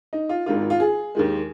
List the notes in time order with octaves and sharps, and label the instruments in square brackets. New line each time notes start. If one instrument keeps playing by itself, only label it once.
[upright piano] D#4
F4
G#1 G#2 D#3 G#3 F4
F4
G#4
D#2 D#3 G#3